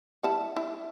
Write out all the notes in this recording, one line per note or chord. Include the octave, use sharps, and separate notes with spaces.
G3 E4 A5
E4